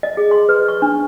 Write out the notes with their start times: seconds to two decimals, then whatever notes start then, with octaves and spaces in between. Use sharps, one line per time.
0.03 D#5
0.17 G#4
0.31 C6
0.49 B4
0.68 C#6
0.82 D4